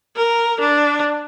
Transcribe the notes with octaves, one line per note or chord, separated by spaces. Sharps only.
A#4
D4